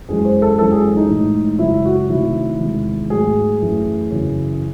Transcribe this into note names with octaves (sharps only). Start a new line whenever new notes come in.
F#2 E3 G#3 G#4
C5
A4
F#2 E3 G#3 A4
G#4
D#4
A2 E3 G#3
F#2 C#3 G#3 E4
F#4
C3 D#3 F#3 A3 E4
E2 C3 D#3 G#3
G#2 F#3 A3 G#4
F#2 E3 A3
F#2 C#3 E3